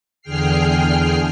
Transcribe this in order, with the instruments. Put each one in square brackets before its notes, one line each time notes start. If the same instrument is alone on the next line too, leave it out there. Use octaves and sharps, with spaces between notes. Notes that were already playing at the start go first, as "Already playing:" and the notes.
[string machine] E2 D3 G#4 G5 F6 C7